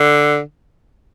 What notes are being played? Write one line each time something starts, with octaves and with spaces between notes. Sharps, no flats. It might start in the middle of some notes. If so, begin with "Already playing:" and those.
Already playing: D3